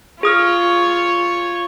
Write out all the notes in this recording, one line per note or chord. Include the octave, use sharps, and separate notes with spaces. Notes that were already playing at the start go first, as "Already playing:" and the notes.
F4 G#4 C#5 D#6 F6